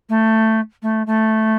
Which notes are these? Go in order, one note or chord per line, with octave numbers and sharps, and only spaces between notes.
A3
A3
A3